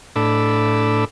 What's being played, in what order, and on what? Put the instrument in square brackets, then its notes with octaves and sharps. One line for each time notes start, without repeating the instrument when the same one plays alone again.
[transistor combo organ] A2 D4 A4 B5 D6 E6